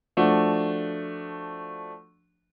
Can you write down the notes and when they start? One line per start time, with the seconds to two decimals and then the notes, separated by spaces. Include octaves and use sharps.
0.17 F3 A3 D4 F#4